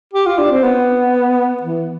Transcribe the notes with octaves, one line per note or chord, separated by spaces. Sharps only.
G4
F4
D4
C4
B3
E3